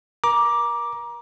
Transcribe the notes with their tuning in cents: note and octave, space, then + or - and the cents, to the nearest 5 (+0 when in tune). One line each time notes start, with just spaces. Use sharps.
A#4 +35 A#5 +25 D6 +0